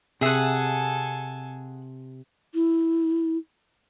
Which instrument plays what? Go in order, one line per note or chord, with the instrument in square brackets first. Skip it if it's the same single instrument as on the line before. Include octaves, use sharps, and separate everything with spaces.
[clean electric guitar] C3 E5 [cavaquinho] G#4 F#5 [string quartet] A4 G#5
[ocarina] E4